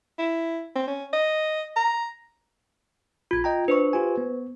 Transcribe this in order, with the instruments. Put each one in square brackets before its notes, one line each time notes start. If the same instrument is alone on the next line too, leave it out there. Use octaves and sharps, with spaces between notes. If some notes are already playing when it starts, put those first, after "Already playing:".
[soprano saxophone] E4
C4
C#4
D#5
A#5
[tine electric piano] A#1 B5 [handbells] F4 G#6
[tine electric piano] D#5 G5 A#5
[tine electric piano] D4 [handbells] B4 C5 C#6
[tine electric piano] F4 G4 G#5
B3